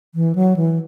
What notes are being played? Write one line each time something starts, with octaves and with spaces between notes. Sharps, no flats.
E3
F#3
E3